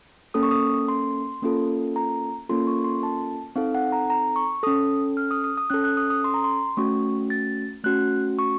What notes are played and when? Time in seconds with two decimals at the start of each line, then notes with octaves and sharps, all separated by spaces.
0.34 A#3 C#4 A4 D#6
0.43 C#6
0.51 D#6
0.88 C6
1.43 A#3 C#4 F4 A4
1.96 A#5
2.49 A#3 C#4 F4 A4 C6
2.67 C#6
2.84 C6
3.03 A5
3.56 C4 D#4 A4 F5
3.75 F#5
3.92 A#5
4.10 A#5
4.36 C#6
4.63 C#4 A4 D#6
5.17 F6
5.31 D#6
5.44 D#6
5.58 D#6
5.70 C#4 A4 F#6
5.84 F#6
5.97 D#6
6.10 D#6
6.24 C6
6.34 A#5
6.44 C6
6.77 A3 C#4 F#4 C#6
7.30 A6
7.84 A3 C#4 F#4 F#6
8.39 C#6